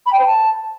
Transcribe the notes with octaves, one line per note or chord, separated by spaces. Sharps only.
B5
G5
C5
A5